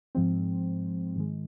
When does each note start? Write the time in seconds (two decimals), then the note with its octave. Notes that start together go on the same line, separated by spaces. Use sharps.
0.15 G#2 F3 G#3 C4
1.16 G#2 D#3 G#3